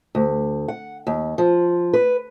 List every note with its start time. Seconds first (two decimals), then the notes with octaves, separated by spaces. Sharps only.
0.15 D2
0.68 F#5
1.07 D#2
1.38 F3
1.93 B4